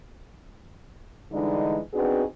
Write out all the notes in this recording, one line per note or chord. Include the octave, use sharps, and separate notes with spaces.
D3 E3 G3 G#3 D4 D#4
B3 C4 D4 D#4 F#4 G#4